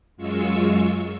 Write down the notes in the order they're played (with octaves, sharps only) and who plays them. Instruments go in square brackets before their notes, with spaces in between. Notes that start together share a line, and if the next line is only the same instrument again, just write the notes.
[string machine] F#2 G#3 F4 C#6 E6